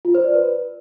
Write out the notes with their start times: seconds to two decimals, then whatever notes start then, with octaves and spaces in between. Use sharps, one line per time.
0.05 F4
0.15 C5
0.24 D5
0.34 B4